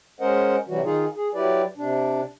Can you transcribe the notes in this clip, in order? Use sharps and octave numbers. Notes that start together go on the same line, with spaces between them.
G#3 C#4 A#4 C5 D#5 F#5
C3 E3 F#3 G3 F#4
D#3 D#4 F4 G#4
G#4
F#3 E4 G4 B4 D5
C3 D4